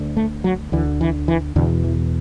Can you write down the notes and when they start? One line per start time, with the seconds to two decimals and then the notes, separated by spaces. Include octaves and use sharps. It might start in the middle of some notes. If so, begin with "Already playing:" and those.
Already playing: D2 D3
0.17 A3
0.44 F#3
0.72 D2 D3 E3
1.01 E3
1.28 E3
1.56 E2 B2 D3
1.84 E3